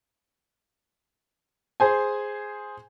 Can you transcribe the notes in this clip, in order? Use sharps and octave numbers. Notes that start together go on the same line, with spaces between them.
G#4 C5 G#5